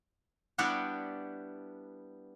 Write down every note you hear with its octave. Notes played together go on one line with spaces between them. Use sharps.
G3 B3 D4 E4 F#4 G4